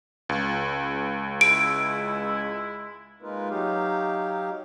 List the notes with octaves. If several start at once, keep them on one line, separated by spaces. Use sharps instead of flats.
C#2
G#3 E4 D7
G#3 A#3 D#4 F4 A#4 B4
F#3 D#4 G4 F5